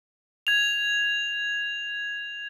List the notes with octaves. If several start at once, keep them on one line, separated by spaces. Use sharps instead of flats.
G#6 F7